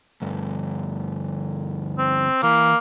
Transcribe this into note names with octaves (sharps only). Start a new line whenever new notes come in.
D2 G2
C4
E3 A#3